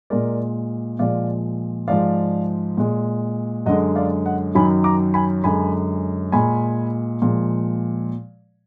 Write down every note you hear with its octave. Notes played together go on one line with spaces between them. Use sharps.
A#2 G#3 A#4 D5
A#2 F3 G#3 D5 F5
G#2 F3 G#3 D5 F5
A#2 G#3
F#2 D3 G#3 D#5 F#5
D5 F5
D#5 F#5
F#2 D#3 F#3 G#5 B5
A#5 D6
G#5 B5
F#2 D3 G#3 G#5 B5
A#2 G#3 G#5 B5
A#2 F3 G#3